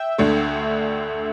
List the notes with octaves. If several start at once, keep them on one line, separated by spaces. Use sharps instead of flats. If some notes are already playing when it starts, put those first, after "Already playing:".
Already playing: E5 G5
D2 D3 A3